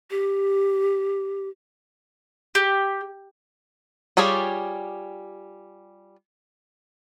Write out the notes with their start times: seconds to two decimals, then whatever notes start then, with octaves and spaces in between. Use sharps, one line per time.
0.11 G4
2.55 G4
4.17 G3 F4 G4 G#4 C#5